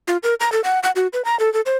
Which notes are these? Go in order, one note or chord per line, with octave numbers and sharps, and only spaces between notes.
F4
A#4
A#5
A4
F#5
F#5
F#4
B4
A#5
A4
A4
C5